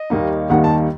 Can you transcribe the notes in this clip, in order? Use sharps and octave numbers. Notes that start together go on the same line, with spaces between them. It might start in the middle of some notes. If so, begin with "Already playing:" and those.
Already playing: D#5
D#2 D#3 G3 A#3 D#4
D#2 D#3 G3 A#3 D#4 F#5
A5